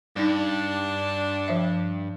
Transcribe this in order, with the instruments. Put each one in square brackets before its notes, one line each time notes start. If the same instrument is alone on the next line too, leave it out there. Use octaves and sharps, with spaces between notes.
[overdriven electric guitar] G2 [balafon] G3 D#4 [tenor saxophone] D4
[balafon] F3 E5